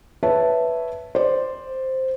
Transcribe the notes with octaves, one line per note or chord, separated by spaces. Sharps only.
B4 C#5 E5 A5
C5 D5